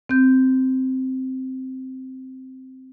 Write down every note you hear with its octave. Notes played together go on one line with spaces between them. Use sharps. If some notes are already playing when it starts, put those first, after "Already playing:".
C4 G6